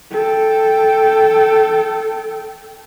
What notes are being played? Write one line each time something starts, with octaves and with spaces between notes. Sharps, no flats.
A4 G5